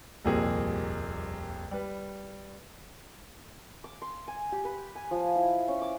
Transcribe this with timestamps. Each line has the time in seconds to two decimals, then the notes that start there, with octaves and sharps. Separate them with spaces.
0.25 D#1 C2 F2 A#2 A#3 G#4
1.71 G3 B4
3.84 D6
4.02 C6
4.28 G#5
4.52 G4
4.65 B4
4.95 G#5
5.11 F3
5.35 E4
5.68 C#4
5.82 D6